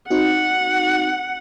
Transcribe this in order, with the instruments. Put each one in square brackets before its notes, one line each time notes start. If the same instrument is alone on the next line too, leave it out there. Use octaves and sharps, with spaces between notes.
[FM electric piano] C4 D#4 F#4 [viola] F#5